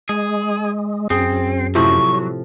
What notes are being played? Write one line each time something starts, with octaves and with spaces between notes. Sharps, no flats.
G#3 G#4
F#2 C4 G#4
A2 C3 F3 F#3 C#6